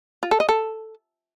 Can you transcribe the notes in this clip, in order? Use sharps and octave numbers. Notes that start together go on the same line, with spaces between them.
F4
A4
D#5
A4